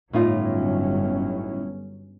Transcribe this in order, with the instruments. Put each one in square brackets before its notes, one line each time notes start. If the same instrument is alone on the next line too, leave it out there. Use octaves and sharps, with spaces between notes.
[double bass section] G1 F#3 C#4 [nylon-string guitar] A2 D#4 F4